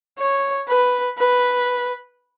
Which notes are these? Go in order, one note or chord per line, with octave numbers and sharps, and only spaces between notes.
C#5
B4
B4